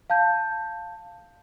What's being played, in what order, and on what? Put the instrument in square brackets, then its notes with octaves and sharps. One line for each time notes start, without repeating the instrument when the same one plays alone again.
[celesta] F5 A5 G6